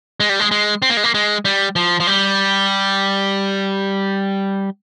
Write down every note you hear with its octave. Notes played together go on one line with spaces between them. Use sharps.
G#3
G3
G#3
G#3
C4
A#3
G#3
A#3
G#3
G3
F3
F3
G3